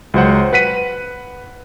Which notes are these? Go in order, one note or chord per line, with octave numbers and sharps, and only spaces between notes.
C#2 F#3 C5 F#5
B4 F#5 B6 D#7